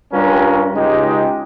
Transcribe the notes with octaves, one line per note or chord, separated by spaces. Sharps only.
G2 G3 C#4 F4 A#4
C#2 C#3 G#3 D#4 G4